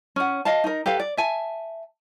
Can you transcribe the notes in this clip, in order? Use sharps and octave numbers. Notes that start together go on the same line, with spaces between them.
C#4 F#5
D#5 F5 A5
D#4 A#4
G4 A4 B4 F5
D5
E5 G#5 A5